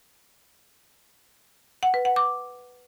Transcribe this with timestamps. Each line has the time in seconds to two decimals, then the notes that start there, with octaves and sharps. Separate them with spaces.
1.83 F#5
1.94 B4
2.05 F#5
2.16 D6